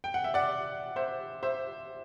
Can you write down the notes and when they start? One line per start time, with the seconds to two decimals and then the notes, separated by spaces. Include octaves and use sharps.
0.04 G5
0.14 F#5
0.24 E5
0.34 D5 F#5
0.96 C5 E5
1.43 C5 E5